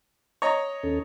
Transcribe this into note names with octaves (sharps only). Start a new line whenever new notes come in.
C#5 D#5 A#5
D#2 C#4 A4